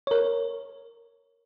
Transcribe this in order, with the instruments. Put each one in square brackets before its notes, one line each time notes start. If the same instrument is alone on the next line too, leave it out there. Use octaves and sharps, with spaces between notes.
[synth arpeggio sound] A#4 C#5